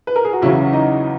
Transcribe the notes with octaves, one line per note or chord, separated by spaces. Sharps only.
B4
A#4
G#4
F#4
E2 C#3 F#3 C#4 E4
D#4 D#5